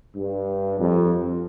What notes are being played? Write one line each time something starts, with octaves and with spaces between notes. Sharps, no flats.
G2
F2